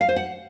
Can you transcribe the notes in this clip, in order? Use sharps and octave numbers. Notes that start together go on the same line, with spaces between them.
F5
C5
F#5